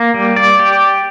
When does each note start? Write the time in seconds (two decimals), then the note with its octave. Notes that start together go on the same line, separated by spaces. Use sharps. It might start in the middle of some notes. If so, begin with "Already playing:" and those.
Already playing: A#3
0.14 G3
0.36 D5
0.59 G4